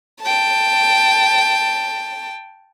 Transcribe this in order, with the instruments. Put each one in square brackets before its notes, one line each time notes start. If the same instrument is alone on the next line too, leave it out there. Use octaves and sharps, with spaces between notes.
[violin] G5 A5